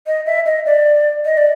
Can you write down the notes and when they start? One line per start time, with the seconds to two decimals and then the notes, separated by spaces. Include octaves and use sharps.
0.07 D#5
0.26 E5
0.46 D#5
0.66 D5
1.25 D#5
1.37 D5